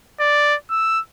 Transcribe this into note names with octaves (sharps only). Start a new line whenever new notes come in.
D5
E6